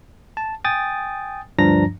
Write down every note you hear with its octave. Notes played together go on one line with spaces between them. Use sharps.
A5
G5 G#5 D#6 A6
D2 G2 F3 D4 A#5 A#6